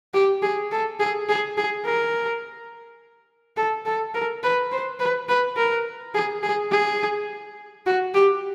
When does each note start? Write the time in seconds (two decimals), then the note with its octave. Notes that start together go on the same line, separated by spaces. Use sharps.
0.14 G4
0.43 G#4
0.72 A4
1.00 G#4
1.29 G#4
1.57 G#4
1.85 A#4
3.57 A4
3.86 A4
4.15 A#4
4.43 B4
4.72 C5
4.99 B4
5.28 B4
5.57 A#4
6.15 G#4
6.43 G#4
6.71 G#4
7.86 F#4
8.14 G4